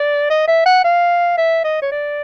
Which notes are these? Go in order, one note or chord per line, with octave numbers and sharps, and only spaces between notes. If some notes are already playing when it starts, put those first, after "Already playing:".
Already playing: D5
D#5
E5
F#5
F5
E5
D#5
C#5
D5